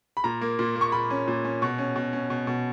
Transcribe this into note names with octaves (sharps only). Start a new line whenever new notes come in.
B5
A#2 A#5
A#3
A#2
A#3
C#6
A#2 B5
C#4
A#2
C#4
B2 C#6
C#4
B2
C#4
B2
B2